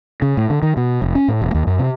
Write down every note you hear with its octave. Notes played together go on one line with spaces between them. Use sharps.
C#3
A2
D3
D#3
B2
F1
C#4
A2
E1
D#2
F#2
C3